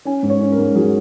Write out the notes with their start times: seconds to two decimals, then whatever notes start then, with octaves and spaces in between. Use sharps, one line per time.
0.05 C#4 G#5
0.23 G#2
0.29 C#5
0.41 C#4
0.52 A#4
0.58 G#2
0.75 F#3 G#4